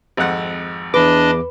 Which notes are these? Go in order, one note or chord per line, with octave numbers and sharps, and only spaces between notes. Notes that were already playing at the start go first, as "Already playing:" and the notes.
G#1 F2 F#5
E2 D4 B4 D#5 D6